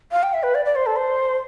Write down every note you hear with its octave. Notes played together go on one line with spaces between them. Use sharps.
F5
G5
E5
B4
D5
D5
C5
A4
C5